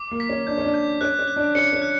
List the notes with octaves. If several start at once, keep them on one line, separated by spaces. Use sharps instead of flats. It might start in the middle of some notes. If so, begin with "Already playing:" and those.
Already playing: D6
A#3
B6
C#4
D4 G6
C#4
D4
G6
C#4 F#6
C#4
F#6
D4
C#4 C#7
C#4
F#6